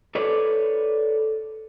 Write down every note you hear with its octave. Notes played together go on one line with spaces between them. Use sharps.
A4 B4 C#5 D5